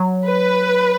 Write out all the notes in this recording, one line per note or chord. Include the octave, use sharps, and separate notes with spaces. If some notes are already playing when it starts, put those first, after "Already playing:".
Already playing: F#3
B4